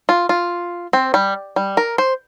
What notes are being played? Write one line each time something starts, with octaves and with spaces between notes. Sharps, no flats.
F4
F4
C4
G3
G3
A#4
C5